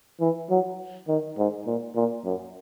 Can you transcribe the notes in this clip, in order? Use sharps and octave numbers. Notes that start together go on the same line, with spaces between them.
E3
F#3
D#3
G#2
A#2
A#2
F#2